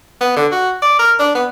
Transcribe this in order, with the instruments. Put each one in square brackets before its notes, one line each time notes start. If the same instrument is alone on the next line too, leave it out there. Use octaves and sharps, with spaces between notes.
[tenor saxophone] B3
D3
F#4
D5
A#4
D4
B3